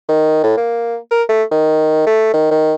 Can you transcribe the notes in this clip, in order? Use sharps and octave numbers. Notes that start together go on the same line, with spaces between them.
D#3
A2
A#3
A#4
A3
D#3
A3
D#3
D#3